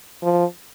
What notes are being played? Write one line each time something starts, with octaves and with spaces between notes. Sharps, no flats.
F3